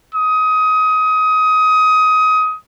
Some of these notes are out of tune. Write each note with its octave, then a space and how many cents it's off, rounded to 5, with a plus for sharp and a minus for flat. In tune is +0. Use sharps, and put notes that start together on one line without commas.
D#6 +20